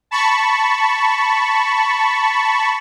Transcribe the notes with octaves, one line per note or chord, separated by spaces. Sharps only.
A5 B5 C#6